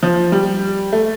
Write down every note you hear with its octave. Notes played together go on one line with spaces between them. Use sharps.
F3
G3
A3